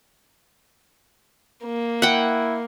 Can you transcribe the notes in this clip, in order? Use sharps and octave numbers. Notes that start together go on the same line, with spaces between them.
A#3
E4 F#5 G5